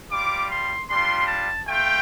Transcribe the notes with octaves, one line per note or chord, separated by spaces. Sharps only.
G3 F4 D6
C6
G3 D4 F4 C6
A5
A3 F4 G5